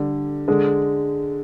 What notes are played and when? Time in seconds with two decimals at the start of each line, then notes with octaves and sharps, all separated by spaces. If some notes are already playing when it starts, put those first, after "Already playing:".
Already playing: D3 G3
0.48 D3 G#3